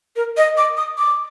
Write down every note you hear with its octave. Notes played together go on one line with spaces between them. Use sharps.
A#4
D#5
D6
D#6
D6